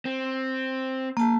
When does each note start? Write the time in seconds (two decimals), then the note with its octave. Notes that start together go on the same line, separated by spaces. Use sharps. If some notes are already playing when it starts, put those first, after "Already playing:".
0.05 C4
1.17 A#3 A5